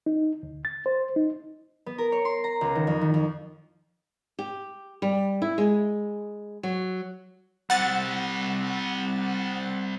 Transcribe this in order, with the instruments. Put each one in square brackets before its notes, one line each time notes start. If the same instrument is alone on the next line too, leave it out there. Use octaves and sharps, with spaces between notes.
[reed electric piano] D#4
D2
A6
C5
D#4
[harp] B3
A#4
C#5
C6
A#5
C#2
D#3
F2
D#3
F2
[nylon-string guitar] G4
G3
E4
G#3
F#3
[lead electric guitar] G3 C4 [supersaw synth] F#5 A6